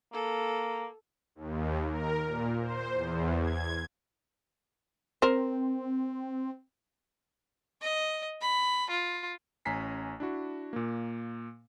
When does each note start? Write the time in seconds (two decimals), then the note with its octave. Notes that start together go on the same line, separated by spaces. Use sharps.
0.13 A#3 A4
1.35 D#2
1.89 A#4
2.26 A#2
2.60 C5
2.93 E2
3.40 G#6
5.22 C4 A#4 C5
7.82 D#5
8.41 B5
8.90 F4
9.65 A1 C#4 G#5 A#5 B6 C7
10.20 D4 E4 F#4
10.73 A#2 A#3